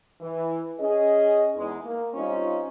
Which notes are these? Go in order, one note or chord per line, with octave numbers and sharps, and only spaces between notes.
E3
C#4 G#4 D#5
E2 G#3 D#4
A#3
G3 C4 C#4 D#4 F4